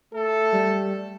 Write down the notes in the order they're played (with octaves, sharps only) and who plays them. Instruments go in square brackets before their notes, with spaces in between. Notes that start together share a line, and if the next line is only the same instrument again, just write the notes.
[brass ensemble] A3 A4
[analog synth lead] G3